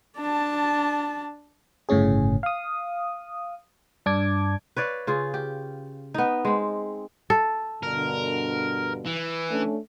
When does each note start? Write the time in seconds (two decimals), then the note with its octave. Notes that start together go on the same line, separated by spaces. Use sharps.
0.16 D4 A5
1.89 G1 A2 C#3 C#4 G#4
2.43 F5 D#6
4.06 G2 D4 A5 D6 G#6
4.77 B4 C#5 D5 F5
5.07 C#3 F4 G#4
5.34 G4
6.14 B3 D#4
6.45 G#3 C4
7.30 A4
7.83 G2 B2 D3 A#4
9.07 E3
9.50 A3 C#4 D4